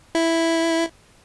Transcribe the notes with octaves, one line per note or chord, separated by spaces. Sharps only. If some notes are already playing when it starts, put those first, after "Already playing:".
E4